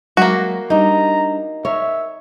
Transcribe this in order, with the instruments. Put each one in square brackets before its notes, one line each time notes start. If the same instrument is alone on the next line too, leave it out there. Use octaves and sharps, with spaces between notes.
[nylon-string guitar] F#3 G#3 E5 [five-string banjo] A#3 F#4
[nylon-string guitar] G3 D4 [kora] D#4 [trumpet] A#5
[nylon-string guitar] A#4 [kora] C#5 [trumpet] E5